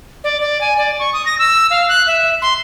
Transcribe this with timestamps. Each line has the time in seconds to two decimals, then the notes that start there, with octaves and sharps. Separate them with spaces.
0.24 D5
0.41 D5
0.61 G#5
0.78 D5
0.99 C#6
1.13 D#6
1.26 A#6
1.39 E6
1.71 F5
1.88 F#6
2.07 E5
2.42 C6